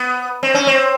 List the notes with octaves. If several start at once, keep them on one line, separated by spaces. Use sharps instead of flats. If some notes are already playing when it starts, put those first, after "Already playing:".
Already playing: B3
C4
C#4
C4